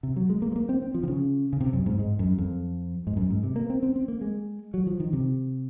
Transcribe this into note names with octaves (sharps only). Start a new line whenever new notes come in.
C3
F#3
G#3
A#3
G#3
A#3
C4
C4
F3
D#3
C#3
C#3
C3
F#2
G#2
G#2
F#2
F2
G#2
F#2
G#2
C3
A#3
C4
C4
C4
A#3
G#3
F#3
F3
D#3
C3